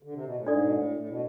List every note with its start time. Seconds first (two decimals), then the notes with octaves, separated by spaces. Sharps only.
0.03 D3
0.13 C3
0.25 B2
0.36 A2
0.47 G#2 D4 A4 D5
0.61 B2
0.71 A2
0.96 A2
1.09 B2